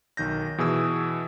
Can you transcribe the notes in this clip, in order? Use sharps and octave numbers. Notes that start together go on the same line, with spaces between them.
B1 D#3 G6 A#6
B2 E3 G#4 D#6 E6